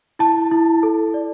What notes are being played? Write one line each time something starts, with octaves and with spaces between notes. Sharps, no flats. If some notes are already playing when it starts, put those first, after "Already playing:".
E4 A5
E4
A4
D5